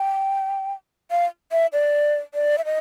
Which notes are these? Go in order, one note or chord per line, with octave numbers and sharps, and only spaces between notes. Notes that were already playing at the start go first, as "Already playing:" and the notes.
Already playing: G5
F5
E5
D5
D5
E5
D#5